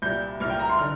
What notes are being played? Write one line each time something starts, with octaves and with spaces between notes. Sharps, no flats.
C2 A#2 G3 G6
C2 A#2 G3 F6
G5
A#5
C6
D3 F6